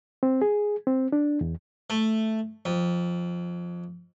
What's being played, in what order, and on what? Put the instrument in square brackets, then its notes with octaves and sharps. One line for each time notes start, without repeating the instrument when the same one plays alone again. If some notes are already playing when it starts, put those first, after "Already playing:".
[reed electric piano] C4
G#4
C4
D4
E2
[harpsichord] A3
F2